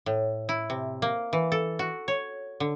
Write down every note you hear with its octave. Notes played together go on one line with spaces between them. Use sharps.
A2
E4
C3
A#3
E3
A4
F#4
C#5
D3